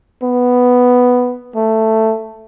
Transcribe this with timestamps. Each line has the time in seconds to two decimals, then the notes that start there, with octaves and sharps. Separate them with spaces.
0.22 B3
1.55 A3